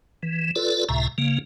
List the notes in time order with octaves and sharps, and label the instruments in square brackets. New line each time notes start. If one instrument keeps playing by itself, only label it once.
[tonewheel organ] E3
F4 A4 B4 D5
C#2 A2 C3 E5 A#5
C#3 A#3